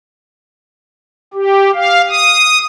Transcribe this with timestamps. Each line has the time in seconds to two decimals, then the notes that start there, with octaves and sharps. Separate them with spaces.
1.34 G4
1.75 F5
2.10 D#6